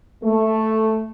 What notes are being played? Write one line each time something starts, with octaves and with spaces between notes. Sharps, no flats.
A3